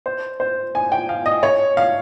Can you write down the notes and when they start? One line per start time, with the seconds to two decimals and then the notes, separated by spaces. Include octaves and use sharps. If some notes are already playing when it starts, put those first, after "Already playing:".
0.06 C5
0.40 C5
0.75 G#5
0.92 G5
1.09 F5
1.26 D#5
1.43 C#5
1.77 F5